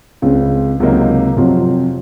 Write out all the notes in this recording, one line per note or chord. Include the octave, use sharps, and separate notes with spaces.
C#2 C#3 G#3 C4
C#2 C3 F#3 A#3 D#4
F2 C3 F#3 C4 F4